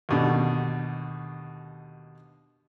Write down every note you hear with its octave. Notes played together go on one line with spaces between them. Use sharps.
D#2 B2 D3